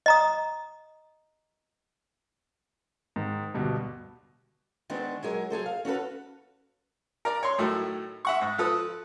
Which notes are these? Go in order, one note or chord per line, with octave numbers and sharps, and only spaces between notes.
D#5 A#5 D#6
G#2 D#3
D2 G2 B2
D#3 G#3 B3 C4 D4
F#3 G#3 G#4 A#4
F#3 G#4 A4 C5
F5
C#4 F#4 A4 B4
A#4 D5
C#5 C6
A2 D#3 F#3 A3
E5 F#5 C#6
G#2
F3 A4 B4 D#6